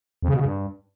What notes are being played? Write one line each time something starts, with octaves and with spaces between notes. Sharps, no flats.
F2
C#3
B2
C#3
G2